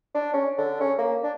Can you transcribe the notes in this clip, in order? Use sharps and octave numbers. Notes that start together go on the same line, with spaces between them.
D4
C#4
D3
C#4
A#3
D4